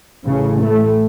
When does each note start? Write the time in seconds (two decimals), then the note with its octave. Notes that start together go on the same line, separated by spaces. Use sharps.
0.24 A1 A2 C#3
0.61 A3